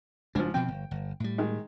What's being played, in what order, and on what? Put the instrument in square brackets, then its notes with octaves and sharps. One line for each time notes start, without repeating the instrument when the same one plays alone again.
[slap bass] F#1 D4 [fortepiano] G#2 F3
[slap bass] B2 F3 C4 [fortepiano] G5
[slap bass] G1
G1
A2 G3
[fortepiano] D#3 G#3